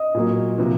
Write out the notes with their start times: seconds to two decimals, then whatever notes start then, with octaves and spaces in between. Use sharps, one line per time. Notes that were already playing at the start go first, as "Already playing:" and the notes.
Already playing: D#5 D#6
0.15 A#2 F#3 A#3
0.58 C3 F3